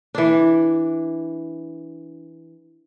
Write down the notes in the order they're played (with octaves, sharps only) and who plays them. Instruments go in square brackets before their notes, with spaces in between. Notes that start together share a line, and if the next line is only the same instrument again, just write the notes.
[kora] E3 D4